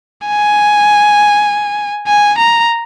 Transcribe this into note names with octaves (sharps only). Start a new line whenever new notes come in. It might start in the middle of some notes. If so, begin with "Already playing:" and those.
G#5
G#5
A#5